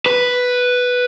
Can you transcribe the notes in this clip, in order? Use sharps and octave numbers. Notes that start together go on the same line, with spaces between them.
B4